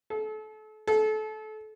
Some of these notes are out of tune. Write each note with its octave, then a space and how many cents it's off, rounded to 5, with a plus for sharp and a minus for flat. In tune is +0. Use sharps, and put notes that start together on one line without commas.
A4 -35
A4 -30